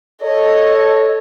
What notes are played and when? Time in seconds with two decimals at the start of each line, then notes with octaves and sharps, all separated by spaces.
0.22 A4 C#5 D#5